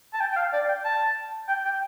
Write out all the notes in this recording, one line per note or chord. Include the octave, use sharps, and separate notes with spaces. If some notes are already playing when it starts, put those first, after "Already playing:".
A5
G5
G5
F5
D5
G5
A5
G5
G5